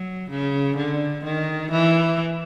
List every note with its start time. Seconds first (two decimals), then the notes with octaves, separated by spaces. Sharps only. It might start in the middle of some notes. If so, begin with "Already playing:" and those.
Already playing: F#3
0.30 C#3
0.77 D3
1.24 D#3
1.71 E3